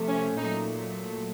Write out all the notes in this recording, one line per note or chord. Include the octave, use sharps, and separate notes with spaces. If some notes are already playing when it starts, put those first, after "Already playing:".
Already playing: C3 F3 A3
C#4
A#2 F#3 A3 D#4